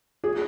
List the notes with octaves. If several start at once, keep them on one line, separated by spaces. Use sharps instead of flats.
G#4